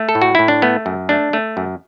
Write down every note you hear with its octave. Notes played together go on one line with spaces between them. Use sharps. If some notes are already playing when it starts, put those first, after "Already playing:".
Already playing: A3
A4
A2
F#4
A2 E4
D4
A3 B3
F#2
A3 D4
A3
F#2